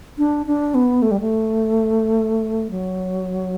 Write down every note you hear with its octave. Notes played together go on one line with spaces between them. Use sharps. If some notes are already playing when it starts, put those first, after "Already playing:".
D4
D4
B3
A3
G3
A3
F#3